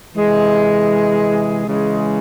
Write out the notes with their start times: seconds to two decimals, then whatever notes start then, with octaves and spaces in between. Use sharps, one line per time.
0.15 C3 E3 G#3
1.67 C#3 E3 G#3